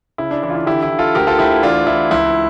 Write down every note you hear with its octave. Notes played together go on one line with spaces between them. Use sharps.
C#3 E4
D4
E3 E4
F4
E4
D3 E4 G4
E4
D3
F4 A4
D2 G4 A#4
F4 A4
D2 E4 G4
E3 D4 F4
E3 E4
C#2 E4